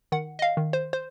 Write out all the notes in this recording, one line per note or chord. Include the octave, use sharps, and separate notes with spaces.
D#3 F#5
D#5
F5
D#3
C5
C5